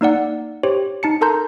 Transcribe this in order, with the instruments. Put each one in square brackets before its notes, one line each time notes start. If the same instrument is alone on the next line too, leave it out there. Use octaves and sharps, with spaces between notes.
[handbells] A#3 D#4 D5 F#5
G4 C5 C#5
D#4 A5 C#7
A4 A#4 A5 A#5 C6 G6